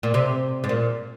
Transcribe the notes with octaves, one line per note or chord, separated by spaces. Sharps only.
A#2
C3
G#2
A#2